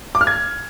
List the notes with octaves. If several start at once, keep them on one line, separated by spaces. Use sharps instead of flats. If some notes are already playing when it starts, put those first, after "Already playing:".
D6
F6
G#6